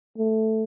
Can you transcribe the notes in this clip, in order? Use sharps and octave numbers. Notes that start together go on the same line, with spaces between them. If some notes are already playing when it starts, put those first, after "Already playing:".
A3